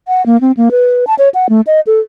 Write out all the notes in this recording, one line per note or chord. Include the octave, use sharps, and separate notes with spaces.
F#5
A#3
C4
A#3
B4
A5
C#5
F#5
A3
D#5
A4